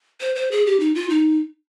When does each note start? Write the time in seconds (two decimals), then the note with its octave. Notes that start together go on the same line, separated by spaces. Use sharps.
0.21 C5
0.35 C5
0.51 G#4
0.66 G4
0.80 D#4
0.95 F4
1.10 D#4